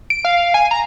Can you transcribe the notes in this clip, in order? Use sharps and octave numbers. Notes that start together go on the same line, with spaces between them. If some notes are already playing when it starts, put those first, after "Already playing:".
D7
F5
G#5
A#5